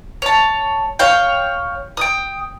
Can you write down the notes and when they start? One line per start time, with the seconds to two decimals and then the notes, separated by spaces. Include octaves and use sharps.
0.22 C#5 A5
0.99 C#5 F5 G5
1.97 G5 D#6